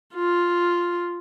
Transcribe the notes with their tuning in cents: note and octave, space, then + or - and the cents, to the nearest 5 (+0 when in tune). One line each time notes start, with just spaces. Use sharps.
F4 +0